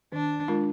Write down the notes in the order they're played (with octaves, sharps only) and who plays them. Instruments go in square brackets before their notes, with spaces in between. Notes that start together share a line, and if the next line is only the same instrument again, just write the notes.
[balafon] D#3 [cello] D4
[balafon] G#3 D4 F4 A#4